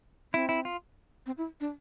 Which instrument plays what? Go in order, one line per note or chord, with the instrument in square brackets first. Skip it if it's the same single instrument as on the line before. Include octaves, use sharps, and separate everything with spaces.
[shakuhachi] C4 [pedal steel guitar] E4
[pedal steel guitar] E4
F4
[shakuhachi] C4
E4
D4